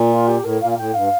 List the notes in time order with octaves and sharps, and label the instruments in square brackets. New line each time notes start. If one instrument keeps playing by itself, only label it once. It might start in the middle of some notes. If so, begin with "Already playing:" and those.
Already playing: [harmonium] A#2
[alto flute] F4
G4
[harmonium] A2 [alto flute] A#4
[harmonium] A#2 [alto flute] F5
[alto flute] F5
[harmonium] A2 [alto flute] G5
[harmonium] G2 [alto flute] F5